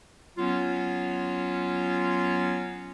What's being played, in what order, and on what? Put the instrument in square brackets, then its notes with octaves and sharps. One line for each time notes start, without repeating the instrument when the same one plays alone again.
[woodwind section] F#3 B3 C#4 F4